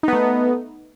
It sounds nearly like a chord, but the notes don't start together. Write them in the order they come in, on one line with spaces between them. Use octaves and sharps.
D#4 B3 A3